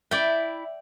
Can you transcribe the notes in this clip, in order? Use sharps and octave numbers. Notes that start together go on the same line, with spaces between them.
E4 D5 G5